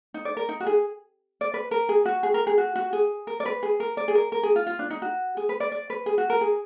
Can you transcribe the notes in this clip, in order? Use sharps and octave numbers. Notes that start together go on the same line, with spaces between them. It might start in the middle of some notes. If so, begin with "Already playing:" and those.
D#4
D5
A#4
D#4
F#4
G#4
D5
B4
A#4
G#4
F#4
G#4
A#4
G#4
F#4
F#4
G#4
A#4
D5
B4
G#4
A#4
D5
G#4
A#4
A#4
G#4
F4
F4
D4
D#4
F#4
G#4
B4
D5
D5
B4
G#4
F#4
A#4
G#4